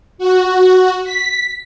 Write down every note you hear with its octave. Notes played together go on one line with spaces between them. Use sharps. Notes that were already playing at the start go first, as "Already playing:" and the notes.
F#4
B6